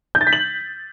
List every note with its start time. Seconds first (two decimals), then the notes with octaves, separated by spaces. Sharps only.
0.15 G6
0.21 A6
0.27 B6
0.33 F#7